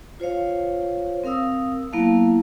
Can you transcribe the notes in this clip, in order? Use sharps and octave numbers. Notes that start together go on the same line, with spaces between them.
F4 C5 C#5 F5
C4 A#4 F5 D#6 E6
F#3 A#3 B3 E4 F5 A5